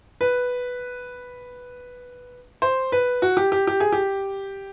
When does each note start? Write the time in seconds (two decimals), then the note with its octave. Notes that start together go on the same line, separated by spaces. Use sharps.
0.21 B4
2.62 C5
2.92 B4
3.22 F#4
3.37 G4
3.52 G4
3.67 G4
3.80 G#4
3.92 G4